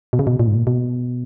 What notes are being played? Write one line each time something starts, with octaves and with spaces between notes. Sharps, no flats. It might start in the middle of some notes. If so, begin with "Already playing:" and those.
B2
C#3
B2
A#2
G#2
A#2
B2